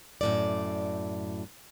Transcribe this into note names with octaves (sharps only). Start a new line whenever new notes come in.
F#2 A2 D5